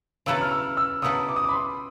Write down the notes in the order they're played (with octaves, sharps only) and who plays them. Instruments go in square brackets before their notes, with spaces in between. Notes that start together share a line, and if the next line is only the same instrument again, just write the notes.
[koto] C#3 F#3 B3 E4 A4 [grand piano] E6
[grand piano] F6
E6
E6
[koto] C#3 F#3 B3 E4 A4 [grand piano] D#6
[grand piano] D6
D#6
D6
B5
C6